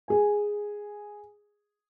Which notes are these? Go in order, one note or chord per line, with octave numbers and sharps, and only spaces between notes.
G#4 G#5